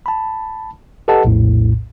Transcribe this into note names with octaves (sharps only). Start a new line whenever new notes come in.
A5 B5
G4 A4 B4 D#5 F#5 A5
A#1 E2 A2